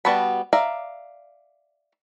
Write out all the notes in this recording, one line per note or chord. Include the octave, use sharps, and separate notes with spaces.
G3 B3 F#4 A5 B5
D5 E5 F5 A#5